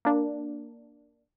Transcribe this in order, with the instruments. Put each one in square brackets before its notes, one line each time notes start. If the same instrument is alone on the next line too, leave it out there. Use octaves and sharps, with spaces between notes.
[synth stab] A#3 D4